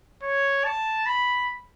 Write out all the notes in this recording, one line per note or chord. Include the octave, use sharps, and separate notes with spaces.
C#5
A5
B5